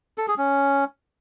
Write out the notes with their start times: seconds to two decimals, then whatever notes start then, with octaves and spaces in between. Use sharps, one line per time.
0.18 A4
0.28 G#4
0.38 C#4